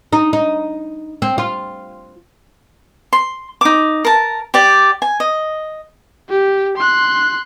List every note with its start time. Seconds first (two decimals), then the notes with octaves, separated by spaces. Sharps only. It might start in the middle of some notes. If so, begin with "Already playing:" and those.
0.13 D#4
0.33 D#4
1.22 C4
1.38 F4
3.13 C6
3.61 D#4 D6
4.05 A#4 A5
4.54 G4 D5 G5
5.02 G#5
5.20 D#5
6.29 G4
6.78 C6 F#6